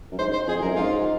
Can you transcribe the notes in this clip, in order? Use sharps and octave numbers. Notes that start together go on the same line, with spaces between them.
F#2
G#2 C5
C5
F2 G#4
F#2 A#4
G#2 F4